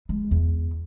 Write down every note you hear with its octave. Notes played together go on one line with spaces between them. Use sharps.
G#3
E2